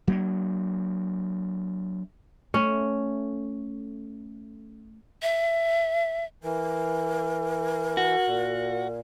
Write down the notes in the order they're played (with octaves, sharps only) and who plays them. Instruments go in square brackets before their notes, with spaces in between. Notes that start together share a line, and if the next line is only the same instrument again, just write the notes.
[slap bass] F#3 A#3 D4
[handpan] A3 [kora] C#4
[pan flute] E5
[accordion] E3 [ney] A#4
[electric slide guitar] F#4
[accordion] A#2